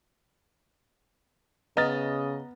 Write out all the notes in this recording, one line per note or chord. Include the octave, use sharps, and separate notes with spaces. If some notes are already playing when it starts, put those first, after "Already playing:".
C#3 B3 D#5 A#5 F6 A6